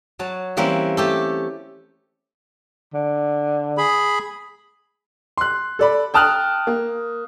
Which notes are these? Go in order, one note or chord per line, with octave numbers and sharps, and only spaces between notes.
F#3 C#5 A5
E3 G3 A#3 C4 C#4 E4
A3 G4 A4
D3
G#4 B5
C6 F#6
A4 D5 B5
G5 A5 D#6 F6 F#6
A#3